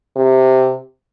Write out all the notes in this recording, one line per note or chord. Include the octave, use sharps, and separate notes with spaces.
C3